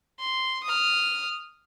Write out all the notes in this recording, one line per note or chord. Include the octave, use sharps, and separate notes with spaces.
C6
D#6 F6